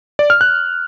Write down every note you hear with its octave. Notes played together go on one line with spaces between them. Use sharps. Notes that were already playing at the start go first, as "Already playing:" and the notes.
D5
F6
F#6